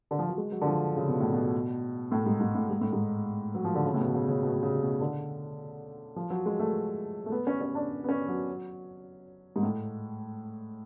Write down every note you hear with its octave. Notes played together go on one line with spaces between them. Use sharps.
D3
F3
F#3
G#3
F#3
D3
F3
C#3
B2
A2
B2
A2
G#2
G#2
A2
G#2
A2
G#2
F#3
F3
D3
C#3
A2
B2
C#3
C#3
B2
B2
C#3
B2
D3
F3
F#3
G#3
A3
A3
B3
C#4
C#4
D4
B3
C#4
F#3
G#2
A2